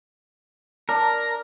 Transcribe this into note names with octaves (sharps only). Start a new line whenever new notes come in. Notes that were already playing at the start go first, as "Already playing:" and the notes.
D4 A#4 A#5